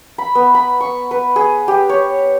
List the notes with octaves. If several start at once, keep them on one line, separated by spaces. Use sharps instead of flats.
B5
B3
B5
C#6
B4
G#4
G4
C#5